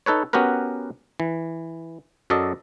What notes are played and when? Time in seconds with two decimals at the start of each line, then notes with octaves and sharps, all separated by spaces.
0.06 D#4 A4 B4 C#5
0.33 B3 C#4 F#4 G4 A#4 B4
1.20 E3
2.30 F#2 F#3 A4 D5 D#5